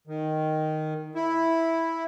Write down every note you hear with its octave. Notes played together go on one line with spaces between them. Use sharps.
D#3
E4